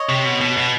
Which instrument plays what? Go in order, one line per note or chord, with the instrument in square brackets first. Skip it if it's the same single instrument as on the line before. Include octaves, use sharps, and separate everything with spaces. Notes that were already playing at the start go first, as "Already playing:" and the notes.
Already playing: [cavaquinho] C#5 D#5
[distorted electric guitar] C3
B2
B2
B2